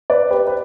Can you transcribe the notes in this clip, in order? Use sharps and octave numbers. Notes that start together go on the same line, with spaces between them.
B4 D5
G4 B4
B4